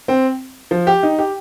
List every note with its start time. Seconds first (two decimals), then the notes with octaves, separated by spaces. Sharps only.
0.08 C4
0.71 F3
0.87 G4
1.03 D#4
1.18 G4